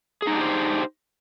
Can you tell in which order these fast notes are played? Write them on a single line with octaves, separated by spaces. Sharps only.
G#4 D#4 D4 G4 C5